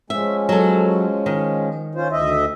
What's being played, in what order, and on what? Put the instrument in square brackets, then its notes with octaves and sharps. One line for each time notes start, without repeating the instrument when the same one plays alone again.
[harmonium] F3 G#3 C#4 [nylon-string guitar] E5
[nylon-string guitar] F#3 A4
D#3
[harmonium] C#4 F4 C5
D2 D#5 E5